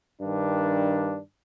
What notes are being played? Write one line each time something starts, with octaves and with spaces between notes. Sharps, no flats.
G2 D#3 D4